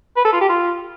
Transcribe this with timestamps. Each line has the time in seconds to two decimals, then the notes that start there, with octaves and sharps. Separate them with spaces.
0.17 B4
0.25 A4
0.33 F4
0.41 G4
0.49 F4